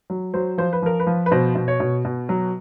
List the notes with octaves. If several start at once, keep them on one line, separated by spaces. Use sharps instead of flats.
F#3
F#3 C5
F3 C5
B4
F3 A#4
B4
F3
B4
B2 C5
B2
C#5
B2
B2
F#3